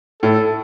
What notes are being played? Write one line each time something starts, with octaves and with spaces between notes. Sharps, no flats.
A2 A4